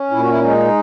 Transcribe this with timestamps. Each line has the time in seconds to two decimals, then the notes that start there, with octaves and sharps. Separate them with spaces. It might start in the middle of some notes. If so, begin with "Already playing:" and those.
Already playing: C#4
0.11 A#2 E4
0.20 F#4
0.29 E4
0.41 G#3 D#4